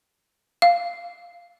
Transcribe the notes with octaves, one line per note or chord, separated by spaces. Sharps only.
F5